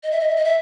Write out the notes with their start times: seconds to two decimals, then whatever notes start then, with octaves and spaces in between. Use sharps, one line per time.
0.03 D#5
0.11 E5
0.20 D#5
0.28 E5
0.36 D#5
0.45 E5